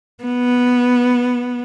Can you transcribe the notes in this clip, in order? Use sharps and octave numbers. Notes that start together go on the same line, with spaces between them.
B3